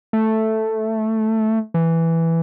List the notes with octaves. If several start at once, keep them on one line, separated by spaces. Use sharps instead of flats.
A3
E3